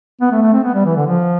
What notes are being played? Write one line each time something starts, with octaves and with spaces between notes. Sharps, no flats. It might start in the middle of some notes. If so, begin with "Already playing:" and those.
B3
A3
A3
C4
B3
G3
E3
D3
F3